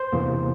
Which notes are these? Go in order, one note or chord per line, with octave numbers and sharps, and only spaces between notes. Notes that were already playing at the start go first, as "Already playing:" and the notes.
Already playing: C5
E2 C3 E3 A#3